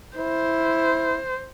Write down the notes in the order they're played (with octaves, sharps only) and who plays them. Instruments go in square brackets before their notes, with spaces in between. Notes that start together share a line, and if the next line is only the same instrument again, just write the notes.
[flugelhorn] E4 [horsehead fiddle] C5